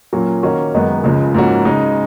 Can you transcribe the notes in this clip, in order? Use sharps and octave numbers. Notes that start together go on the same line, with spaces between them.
A#2 F#3 A#3 C#4 F#4
D#3 A#3 C#4 F#4
F#2 D#3 G#3 B3
C#2 C#3 F3 G#3
G#2 F3 A#3 C#4 F#4
C#3 G#3 D#4